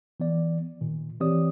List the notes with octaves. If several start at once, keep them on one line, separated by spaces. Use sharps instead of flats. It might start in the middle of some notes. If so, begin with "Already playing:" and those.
E3 B3 D5
A#2 D#3
E3 C4 G4 C#5 D5 D#6